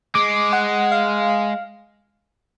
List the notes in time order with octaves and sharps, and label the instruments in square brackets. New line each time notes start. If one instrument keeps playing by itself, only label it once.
[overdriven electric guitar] G#3 [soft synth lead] D6
[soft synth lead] F#5
F5